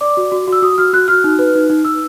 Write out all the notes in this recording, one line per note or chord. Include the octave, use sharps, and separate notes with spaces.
D5 D6
F#4
F#4
F#4
E6
F#4 D#6
F#4 F6
F#4 F#6
F#4 F6
D#4
B4
D#4
D#4
D#4 E6